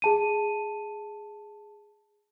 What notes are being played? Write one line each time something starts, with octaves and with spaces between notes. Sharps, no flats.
G#4 A5 D#7